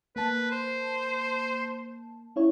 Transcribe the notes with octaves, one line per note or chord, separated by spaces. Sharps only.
A#3 B4 A5
C5
C#4 E4 C#5